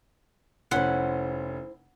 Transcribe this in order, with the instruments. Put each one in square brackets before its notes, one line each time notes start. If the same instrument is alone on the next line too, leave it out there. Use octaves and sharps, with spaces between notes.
[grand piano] F1 C#4 [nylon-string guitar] E4 C5 [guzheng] F#5 C6